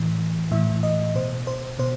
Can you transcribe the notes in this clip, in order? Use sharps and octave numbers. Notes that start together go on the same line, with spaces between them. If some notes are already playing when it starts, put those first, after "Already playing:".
Already playing: A2 E3
A2 E3 E5
D#5
B2 C5
C5
B2 C5